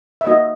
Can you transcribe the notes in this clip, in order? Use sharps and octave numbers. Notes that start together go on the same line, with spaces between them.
E5
A#3 D#4 F#4 D#5